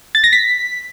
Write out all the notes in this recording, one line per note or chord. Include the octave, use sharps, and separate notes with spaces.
A6
A#6
B6